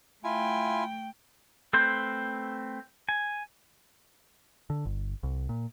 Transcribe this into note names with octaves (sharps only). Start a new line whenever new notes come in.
A3 E4 F4 G5 G#5
A3 C4 B4 C5
G#5
D3
G1
C2
A#2